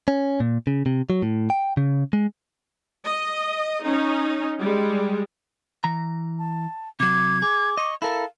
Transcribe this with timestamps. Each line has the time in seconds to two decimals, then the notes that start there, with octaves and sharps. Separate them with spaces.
0.08 C#4
0.40 A#2
0.67 C#3
0.86 C3
1.10 F#3
1.22 A2
1.50 G5
1.77 C#3
2.13 G#3
3.07 D#5
3.85 C#4 D#4
4.61 G3 G#3
5.84 E3 A#5
6.39 A5
7.00 C3 F#3 D6 G#6
7.42 G#4 D6
7.77 D#5 C#6
8.02 E4 A4 A#4 F5